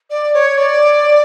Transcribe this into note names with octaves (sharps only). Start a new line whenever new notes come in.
D5
C#5
D5